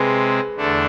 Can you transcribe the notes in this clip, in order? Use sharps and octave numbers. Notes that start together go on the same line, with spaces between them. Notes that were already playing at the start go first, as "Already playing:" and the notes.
Already playing: C3 G#3 C4 G#4 B4
E2 D3 A3 D4 A4